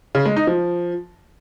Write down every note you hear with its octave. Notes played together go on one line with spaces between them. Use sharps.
C#3
G#3
D#4
F3